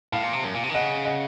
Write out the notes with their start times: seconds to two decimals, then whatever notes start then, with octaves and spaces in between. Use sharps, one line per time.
0.12 A2 F5 A5
0.23 A#2
0.33 C3
0.44 F#2
0.54 A#2
0.64 C3
0.69 D#3
0.74 C#3 D#5 F#5
1.05 D#5 F#5